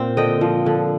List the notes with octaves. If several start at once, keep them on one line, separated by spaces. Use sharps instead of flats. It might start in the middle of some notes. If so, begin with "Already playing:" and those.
Already playing: A#2 C4
D3 D#5 G5
F3
D3